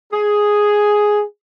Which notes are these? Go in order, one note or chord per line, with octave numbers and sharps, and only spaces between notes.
G#4